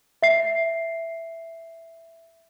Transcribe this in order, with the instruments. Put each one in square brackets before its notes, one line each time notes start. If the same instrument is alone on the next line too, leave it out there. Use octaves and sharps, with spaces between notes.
[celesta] E5 C7